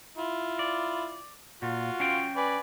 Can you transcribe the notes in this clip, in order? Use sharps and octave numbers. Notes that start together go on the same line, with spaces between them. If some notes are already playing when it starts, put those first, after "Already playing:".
E4 F4
D5
A#2 F4 F#4
C#4 F5 G5
B4 D5 G#5